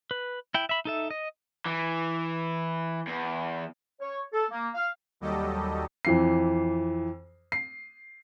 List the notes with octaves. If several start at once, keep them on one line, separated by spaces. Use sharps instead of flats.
B4
E4 G5
E5 B5
D#4 A4 E5
D#5
E3
E2
C#5
A4
A#3
F5
D#2 F#3 G3 G4 A4 D#5
F2 E3 C7
C7